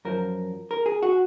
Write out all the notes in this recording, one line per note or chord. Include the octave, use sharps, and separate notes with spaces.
F#2 F3 A#4
A#4
G#4
F#4